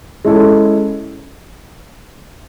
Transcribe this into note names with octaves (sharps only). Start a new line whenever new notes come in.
G#3 C#4 E4 A4